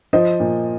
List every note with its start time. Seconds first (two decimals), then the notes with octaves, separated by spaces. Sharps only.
0.13 F3 C5 D#5
0.40 A#2